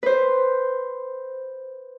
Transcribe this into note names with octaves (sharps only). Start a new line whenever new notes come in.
B4 C5